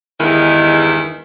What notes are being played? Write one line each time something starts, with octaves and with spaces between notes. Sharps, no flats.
E2 G2 D#3 G#3 E4